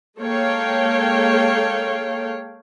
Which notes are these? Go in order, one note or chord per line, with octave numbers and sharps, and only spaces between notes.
G#3 A#3 A4 C#5 F5 G5